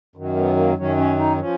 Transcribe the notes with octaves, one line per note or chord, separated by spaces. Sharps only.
F#2 D#3 F#3
B3
A#3
F#2 D#3 F#3 C#4
C#4
D#4
F3 C#4